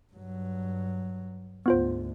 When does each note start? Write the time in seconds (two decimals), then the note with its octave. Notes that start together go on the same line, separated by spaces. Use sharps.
0.14 G2 F#3
1.66 D2 G#2 B3 F4 C5